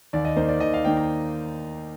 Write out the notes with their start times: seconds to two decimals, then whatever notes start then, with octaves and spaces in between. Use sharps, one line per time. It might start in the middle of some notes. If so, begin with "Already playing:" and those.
0.13 D#2 D5
0.25 D#5
0.36 D#3 A#3 D#4 C5
0.49 D5
0.60 D#2 D#5
0.74 F5
0.85 D#3 A#3 D#4 G5
0.97 A#5